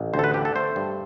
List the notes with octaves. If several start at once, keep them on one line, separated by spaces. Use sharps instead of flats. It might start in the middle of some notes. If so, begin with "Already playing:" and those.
Already playing: A1
D2 C5
A4
B4
D3 G4
A4
A3 C5
G2